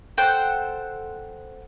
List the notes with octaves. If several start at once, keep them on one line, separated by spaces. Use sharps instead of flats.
A4 C5 F#5 G5